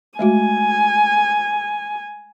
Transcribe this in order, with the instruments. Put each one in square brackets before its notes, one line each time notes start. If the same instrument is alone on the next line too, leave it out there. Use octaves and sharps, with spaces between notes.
[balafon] G#3 A3 F#4 [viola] G#5